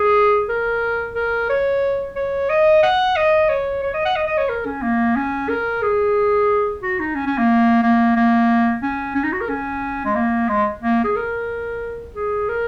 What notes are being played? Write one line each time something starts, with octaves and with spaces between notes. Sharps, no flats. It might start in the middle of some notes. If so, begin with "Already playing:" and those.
Already playing: G#4
A#4
A#4
C#5
C#5
D#5
F#5
D#5
C#5
C#5
D#5
F#5
D#5
D#5
C#5
A#4
C#4
A#3
C#4
A#4
G#4
F#4
D#4
C#4
C#4
A#3
A#3
A#3
C#4
C#4
D#4
F#4
A#4
C#4
G#3
A#3
G#3
A#3
G#4
A#4
G#4
A#4